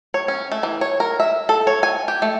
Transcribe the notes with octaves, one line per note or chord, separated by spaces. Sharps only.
C#5
C#4
A3
E3
C#5
A#4
E5
A4
C#5
G#5
G4
A3